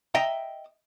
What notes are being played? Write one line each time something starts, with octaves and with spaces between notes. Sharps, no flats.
D#5 E5 G5 A#5